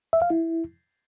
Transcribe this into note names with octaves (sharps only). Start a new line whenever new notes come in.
E5
F5
E4